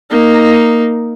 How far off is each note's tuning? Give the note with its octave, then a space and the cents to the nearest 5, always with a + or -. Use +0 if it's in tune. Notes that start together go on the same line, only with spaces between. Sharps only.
A#3 +0 D#4 +0